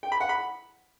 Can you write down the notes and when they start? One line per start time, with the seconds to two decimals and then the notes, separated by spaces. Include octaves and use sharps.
0.03 G5
0.12 B5
0.20 F#5
0.29 B5